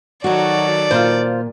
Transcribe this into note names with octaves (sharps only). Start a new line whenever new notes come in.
D#3 F#3 D#4 F#4 A4 D5
A#2 F4 C5